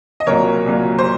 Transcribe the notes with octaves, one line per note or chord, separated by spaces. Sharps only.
D#5
C2 A#2 F#3 A#4 C#5
C2 A#2 F#3
C5